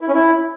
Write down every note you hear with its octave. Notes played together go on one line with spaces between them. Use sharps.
E4
C#4
E4